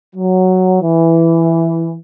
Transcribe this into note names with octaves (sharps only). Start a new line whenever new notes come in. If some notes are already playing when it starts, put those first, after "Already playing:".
F#3
E3